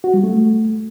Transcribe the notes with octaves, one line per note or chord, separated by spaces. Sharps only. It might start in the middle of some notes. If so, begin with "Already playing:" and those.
F#4
G3
A3